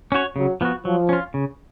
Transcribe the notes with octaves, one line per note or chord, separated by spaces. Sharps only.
C#4 F#4 C#5
C#3 F#3
F3 B3 F#4
F3 F#3
C#4 F4
C#3